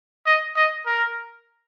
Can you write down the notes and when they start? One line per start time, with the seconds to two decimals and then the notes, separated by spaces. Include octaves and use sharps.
0.27 D#5
0.57 D#5
0.87 A#4